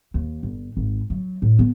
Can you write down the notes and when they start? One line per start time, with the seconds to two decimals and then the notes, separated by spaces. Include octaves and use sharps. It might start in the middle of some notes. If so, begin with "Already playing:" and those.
0.14 D#2
0.43 G1
0.77 G#1
1.10 F#3
1.42 A2
1.59 B3